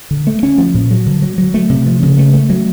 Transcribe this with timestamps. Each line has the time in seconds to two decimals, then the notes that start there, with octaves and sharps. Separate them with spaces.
0.11 D3
0.27 A3
0.43 C#4
0.58 F3
0.74 A#2
0.91 F#3
1.06 D3
1.22 F#3
1.38 F#3
1.54 A3
1.69 C3
1.86 F3
2.03 C#3
2.18 A3
2.33 A3
2.50 F#3